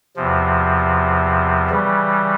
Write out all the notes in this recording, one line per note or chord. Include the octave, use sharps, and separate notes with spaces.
E2 C3 F3
C#3 E3 G3